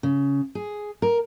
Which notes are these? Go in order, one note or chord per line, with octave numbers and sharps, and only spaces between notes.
C#3
G#4
A#4